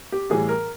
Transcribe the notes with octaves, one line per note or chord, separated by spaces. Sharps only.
G4
A2 E3 G3 G#4
A#4